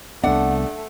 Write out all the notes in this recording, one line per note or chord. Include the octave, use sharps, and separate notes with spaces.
C2 A3 B3 D4 F#5